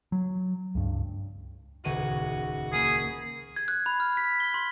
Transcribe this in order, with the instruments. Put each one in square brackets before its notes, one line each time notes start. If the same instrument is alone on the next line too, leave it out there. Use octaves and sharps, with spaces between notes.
[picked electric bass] F#3
C#2 G2
[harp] D#1 C#2 D#7 [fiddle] F#4
[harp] A#3 B5 [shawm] G#4
[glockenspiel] G#6
F#6
B5
F6
B6
G7
C6